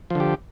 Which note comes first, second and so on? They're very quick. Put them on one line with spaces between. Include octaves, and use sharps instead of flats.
F3 D3 G4